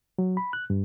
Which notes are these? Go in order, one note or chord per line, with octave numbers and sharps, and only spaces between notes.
F#3
B5
F#6
G2